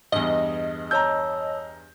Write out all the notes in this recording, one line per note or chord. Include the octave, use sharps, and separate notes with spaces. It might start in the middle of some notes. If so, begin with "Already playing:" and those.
E2 G2 D#5
C#5 A5 A#5 E6 G6